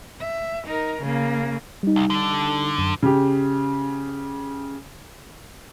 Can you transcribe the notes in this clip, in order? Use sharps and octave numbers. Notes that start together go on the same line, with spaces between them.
E5
D#4 A#4
C#3 A#3
G3 D#4
C2
D3
F#2
C#3 G4